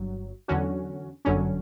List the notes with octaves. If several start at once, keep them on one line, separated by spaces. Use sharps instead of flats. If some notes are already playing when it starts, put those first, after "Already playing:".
Already playing: G1 G2 F#3
E2 D3 F#3 C#4 F#4
G1 F#2 D3 F#3 C#4